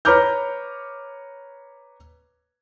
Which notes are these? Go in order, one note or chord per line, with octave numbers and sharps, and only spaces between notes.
B4 C#5 A#5 D6 F6 G6